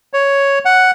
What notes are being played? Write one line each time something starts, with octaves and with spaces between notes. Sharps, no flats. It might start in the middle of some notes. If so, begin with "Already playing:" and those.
C#5
F#5